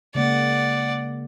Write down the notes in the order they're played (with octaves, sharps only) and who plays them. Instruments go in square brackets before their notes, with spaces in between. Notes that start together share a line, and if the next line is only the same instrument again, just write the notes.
[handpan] C#3 G#3 A#3 [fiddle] D5 F#5